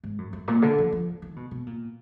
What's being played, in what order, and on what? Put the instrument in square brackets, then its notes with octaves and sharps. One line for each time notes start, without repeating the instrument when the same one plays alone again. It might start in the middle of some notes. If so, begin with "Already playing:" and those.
[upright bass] G#2
F#2
F#2
A#2
D3
F3
F3
D#3
B2
B2
A#2